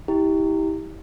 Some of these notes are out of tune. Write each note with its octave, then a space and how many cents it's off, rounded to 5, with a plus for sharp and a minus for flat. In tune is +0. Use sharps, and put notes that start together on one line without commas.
E4 -35 G4 +0